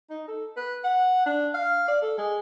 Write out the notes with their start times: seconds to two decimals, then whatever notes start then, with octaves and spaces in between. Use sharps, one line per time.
0.10 D#4
0.28 A4
0.57 B4
0.84 F#5
1.26 D4
1.54 F5
1.88 D5
2.02 A4
2.18 G#3